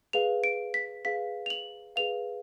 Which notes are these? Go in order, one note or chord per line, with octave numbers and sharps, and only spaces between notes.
G#4 B4 F5 F7
D7
B6
G#4 B4 F5 B6
F7
F#7
G#4 B4 F5 F7